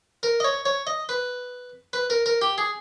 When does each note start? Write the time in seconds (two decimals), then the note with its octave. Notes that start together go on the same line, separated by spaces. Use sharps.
0.23 A#4
0.40 D#5
0.44 C#5
0.65 C#5
0.87 D#5
1.09 B4
1.93 B4
2.10 A#4
2.26 A#4
2.42 G4
2.58 G#4